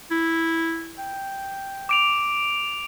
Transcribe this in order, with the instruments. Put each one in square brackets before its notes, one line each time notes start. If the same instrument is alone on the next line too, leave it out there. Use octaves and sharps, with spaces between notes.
[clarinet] E4
G5
[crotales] D6 D7 F7